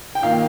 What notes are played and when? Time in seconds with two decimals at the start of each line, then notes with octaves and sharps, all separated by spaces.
0.15 G5
0.22 D#3 A#3 F4 F5